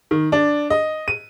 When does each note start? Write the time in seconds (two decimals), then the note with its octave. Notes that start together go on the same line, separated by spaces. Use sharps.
0.11 D#3
0.32 D4
0.70 D#5
1.08 D#7